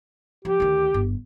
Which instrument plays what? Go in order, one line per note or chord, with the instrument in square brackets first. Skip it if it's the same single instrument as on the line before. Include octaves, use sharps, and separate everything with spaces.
[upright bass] F3 [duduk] G4
[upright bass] D2 D#3
G1